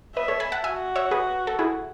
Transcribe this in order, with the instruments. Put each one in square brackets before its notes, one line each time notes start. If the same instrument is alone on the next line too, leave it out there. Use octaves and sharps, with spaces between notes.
[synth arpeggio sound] B4 D#5 [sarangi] E5
[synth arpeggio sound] A4 C#5
G#5 B5
F#5 A5
[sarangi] F#4 [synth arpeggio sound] E5 G#5
[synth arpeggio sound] C#5 E5
G#4 B4
A4
E4 G#4